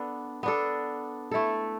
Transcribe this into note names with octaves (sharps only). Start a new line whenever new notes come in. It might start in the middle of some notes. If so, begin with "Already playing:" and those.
Already playing: B3 D4 A4
B3 D4 A4
A3 E4 A4